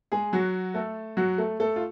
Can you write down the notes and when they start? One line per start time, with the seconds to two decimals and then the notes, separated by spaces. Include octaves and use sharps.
0.12 G#3 G#4
0.33 F#3 F#4
0.74 A3 A4
1.17 F#3 F#4
1.38 A3 A4
1.60 A3 A4
1.76 F4